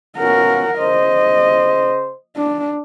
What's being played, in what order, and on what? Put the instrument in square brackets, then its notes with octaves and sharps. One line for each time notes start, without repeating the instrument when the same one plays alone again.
[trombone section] B2 C#4 F4 [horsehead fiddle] A#4 F#5
[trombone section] C#3 C5 [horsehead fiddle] D#5
[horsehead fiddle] D4